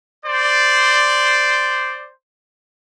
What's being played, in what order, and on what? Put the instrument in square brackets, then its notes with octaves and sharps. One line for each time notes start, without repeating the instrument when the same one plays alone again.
[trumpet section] C5 D5